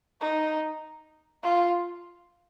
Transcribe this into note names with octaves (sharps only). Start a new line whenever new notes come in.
D#4
F4